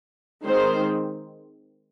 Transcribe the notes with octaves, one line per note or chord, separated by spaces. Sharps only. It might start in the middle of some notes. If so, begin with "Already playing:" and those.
D#3 G#3 C4 C5